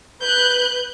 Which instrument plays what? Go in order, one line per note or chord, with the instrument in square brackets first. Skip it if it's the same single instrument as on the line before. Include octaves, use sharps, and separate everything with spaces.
[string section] B4 F#6 [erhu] G6